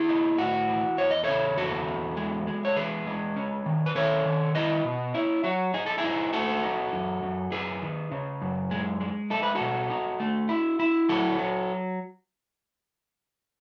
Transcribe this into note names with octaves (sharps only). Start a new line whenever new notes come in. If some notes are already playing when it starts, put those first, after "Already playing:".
Already playing: E4 G#4
D#4
A2 F#4
E3
E2 C#5
D#5
C#3 A4 C#5
E2 F#4 A4
E2
G#3
G#3
C#5
E3 G#4 B4
G#3
C#4
D#3
B4
D#3 A4 C#5
D#3
E4 B4 D#5
B2
C#4 E4
F#3 F#4
D#4 G#4
A4
E4 G#4
D#4
A3 F#4 A4
D#4
F#2
F#2
F#2 G#4 B4
D#3
C#3
F#2
G#3
G#3
D#4 A4
B4
F#4 A4
B2
D#4
A3
E4
E4
F#3 F#4 A4
F#3